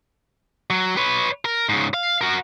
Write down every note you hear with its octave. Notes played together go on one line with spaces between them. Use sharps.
F#3
B4 C#5
A#4
G#2 C#3
F5
F#4 A#4